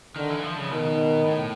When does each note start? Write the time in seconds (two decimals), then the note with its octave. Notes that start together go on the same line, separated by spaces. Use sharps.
0.16 D3 D#3
0.30 E3
0.43 F3
0.57 C#3
0.71 B2 D#3
1.26 A2